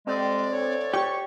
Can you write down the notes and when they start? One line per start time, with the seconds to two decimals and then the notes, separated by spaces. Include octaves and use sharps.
0.07 F2 G3 G#3 C4 D5
0.52 D2 C#5
0.94 G4 C#6